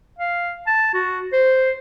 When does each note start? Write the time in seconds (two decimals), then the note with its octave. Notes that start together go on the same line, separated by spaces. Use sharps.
0.18 F5
0.67 A5
0.94 F#4
1.33 C5